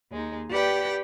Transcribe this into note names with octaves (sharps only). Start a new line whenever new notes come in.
D#2 G#3 D#4
G4 B4 D5 F#5 G5